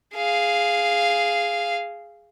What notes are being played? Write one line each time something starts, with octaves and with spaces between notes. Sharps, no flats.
G#4 F5